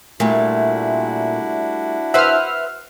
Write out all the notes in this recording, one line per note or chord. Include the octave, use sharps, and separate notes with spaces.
A#2 G3 A3 D4 E4 F#4
B4 C5 E5 F#5 F6